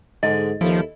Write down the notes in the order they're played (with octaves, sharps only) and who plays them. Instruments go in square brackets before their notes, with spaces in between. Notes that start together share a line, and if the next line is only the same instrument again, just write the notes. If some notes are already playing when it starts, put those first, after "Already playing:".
[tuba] G#2 [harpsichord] D3 G#3 [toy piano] D#5
[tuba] D#2 [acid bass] F3 [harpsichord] E4 A4